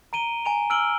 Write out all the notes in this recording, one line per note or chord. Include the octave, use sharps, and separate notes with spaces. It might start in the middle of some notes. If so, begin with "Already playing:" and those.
A#5 D7 D#7 G7
G#5 A#5 D7 F7
E6 F6 D7 F#7 G7